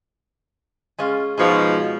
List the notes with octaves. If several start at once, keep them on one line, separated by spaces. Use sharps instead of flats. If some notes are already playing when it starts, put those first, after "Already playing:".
G#3 C#4 F4
G#2 B2 F3 G#3 C#5